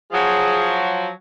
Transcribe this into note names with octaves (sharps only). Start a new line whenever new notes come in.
F3 F#3 G#4